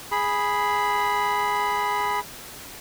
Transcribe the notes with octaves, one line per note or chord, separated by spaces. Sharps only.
G#4 B5